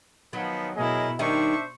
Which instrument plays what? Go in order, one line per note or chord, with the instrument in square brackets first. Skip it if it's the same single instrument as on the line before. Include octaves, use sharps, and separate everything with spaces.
[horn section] D#3 F3 B3 [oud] F#3
[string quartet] B2 E4 [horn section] G#4 A#4 D#5
[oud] D#3 G3 D#4 [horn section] D4 C5 E5 [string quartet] C#6